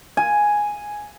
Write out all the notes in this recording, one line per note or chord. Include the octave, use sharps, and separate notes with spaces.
G#5